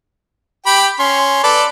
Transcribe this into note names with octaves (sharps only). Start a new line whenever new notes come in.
G4 G5 B5
C#4 C6
A4 B4 D5